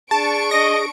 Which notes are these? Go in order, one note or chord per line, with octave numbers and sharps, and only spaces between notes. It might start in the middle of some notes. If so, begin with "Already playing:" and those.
D4 G#4 A5 C#6 D7
D#5 A#6